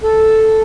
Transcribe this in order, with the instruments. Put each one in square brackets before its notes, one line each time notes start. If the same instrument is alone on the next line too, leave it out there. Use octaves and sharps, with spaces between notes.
[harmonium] A4